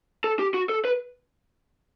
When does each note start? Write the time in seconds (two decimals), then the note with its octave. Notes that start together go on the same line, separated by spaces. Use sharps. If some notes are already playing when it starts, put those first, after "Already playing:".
0.24 A4
0.39 G4
0.54 F#4
0.69 A4
0.85 B4